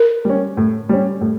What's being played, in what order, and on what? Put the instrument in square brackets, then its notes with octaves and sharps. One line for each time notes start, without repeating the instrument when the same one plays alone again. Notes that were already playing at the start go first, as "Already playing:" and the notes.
Already playing: [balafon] A#4
[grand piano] G3 C#4
A2
G3 C#4
A2